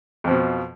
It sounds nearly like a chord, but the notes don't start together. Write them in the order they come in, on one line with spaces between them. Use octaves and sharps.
F2 F3 B2